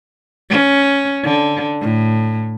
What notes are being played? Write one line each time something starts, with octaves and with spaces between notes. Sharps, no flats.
C#4
D3
A2